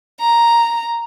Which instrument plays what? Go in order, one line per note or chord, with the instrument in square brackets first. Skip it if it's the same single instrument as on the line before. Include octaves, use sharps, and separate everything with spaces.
[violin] A#5